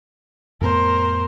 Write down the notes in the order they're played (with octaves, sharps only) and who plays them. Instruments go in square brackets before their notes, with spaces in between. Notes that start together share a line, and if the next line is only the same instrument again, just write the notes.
[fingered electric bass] F2 A2 B3 [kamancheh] A#4 C5